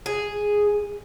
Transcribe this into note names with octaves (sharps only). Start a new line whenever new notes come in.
G#4